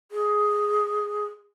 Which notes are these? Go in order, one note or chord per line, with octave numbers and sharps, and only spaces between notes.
G#4